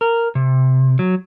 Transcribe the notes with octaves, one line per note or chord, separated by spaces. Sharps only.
A#4
C3
F#3